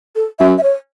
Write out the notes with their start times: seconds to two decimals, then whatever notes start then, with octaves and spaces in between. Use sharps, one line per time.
0.15 A4
0.39 F#2 E5
0.58 E5
0.63 C#5